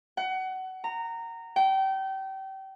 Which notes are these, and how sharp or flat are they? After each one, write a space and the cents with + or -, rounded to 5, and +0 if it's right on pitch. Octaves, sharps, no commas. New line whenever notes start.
F#5 +25
A#5 -15
G5 -30